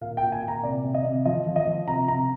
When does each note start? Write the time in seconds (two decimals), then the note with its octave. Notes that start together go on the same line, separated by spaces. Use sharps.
0.01 A#2 F5
0.17 G5
0.22 A#2
0.32 G#5
0.43 A#2
0.48 A#5
0.63 C3 D5
0.84 C3
0.94 D#5
1.05 C3
1.25 F3 D#5
1.47 F3
1.56 D#5
1.67 F3
1.88 C3 A#5
2.08 C3 A#5